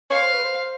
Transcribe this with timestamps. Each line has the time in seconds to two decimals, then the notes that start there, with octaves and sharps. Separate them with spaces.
0.10 C#5 F5
0.22 C5
0.32 B4
0.44 C5